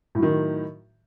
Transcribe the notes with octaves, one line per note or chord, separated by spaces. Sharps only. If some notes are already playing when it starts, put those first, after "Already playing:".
A2 D#3 F#3